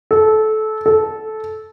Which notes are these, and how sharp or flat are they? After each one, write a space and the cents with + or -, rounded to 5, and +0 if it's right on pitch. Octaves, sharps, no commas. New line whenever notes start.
A4 -20
A4 -15